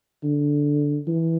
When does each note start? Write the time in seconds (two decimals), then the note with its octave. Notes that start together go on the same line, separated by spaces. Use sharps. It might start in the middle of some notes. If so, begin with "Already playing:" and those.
0.23 D3
1.07 E3